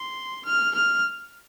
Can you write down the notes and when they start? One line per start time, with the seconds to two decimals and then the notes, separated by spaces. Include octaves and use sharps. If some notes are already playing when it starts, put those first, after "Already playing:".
Already playing: C6
0.45 F6
0.75 F6